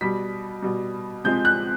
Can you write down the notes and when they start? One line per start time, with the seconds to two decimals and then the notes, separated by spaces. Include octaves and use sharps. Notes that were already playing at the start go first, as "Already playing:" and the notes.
0.01 B2 G3 B6
0.62 B2 G3
1.24 C3 F3 G#3 G6
1.45 F#6